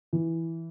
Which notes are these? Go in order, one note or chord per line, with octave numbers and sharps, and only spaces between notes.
E3